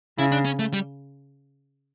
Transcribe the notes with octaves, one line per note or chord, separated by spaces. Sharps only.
C#3 E4
D4
C#4
A3
G3